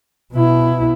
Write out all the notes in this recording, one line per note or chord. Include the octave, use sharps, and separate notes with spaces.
B2 E4